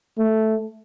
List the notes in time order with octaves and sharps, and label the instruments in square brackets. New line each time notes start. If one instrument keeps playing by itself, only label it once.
[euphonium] A3